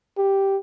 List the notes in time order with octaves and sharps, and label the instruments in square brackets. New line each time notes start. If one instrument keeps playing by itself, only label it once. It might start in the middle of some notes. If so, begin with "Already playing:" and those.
[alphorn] G4